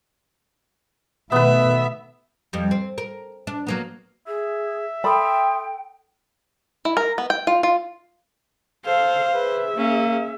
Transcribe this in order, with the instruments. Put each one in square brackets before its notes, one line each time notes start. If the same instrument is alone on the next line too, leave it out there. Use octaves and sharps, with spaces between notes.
[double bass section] B2 D#3 A3 [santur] B3 B4 [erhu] E5
[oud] F2 G3
C4
A#4
D4
F#3 A#3 B3
[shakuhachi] G#4 [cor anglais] E5
[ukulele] A4 B5 [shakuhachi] G5 [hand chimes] C6 D#6
[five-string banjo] E4
A#4
B3
G5
F4
F4
[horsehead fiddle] A4 F5 [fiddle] C5
[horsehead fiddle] G#4 E5 [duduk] B4
[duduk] A#3 [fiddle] C#4